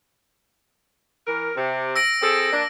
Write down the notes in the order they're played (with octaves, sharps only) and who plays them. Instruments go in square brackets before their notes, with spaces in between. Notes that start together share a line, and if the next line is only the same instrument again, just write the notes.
[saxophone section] E3 A#4
C3
[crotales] E6 A#6 D7
[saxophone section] C4 G#4 A4
A#3 D4